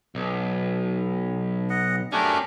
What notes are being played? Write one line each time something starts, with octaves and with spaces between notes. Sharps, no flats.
B1
D#5 F#5
A3 C#4 D4 G4 A#4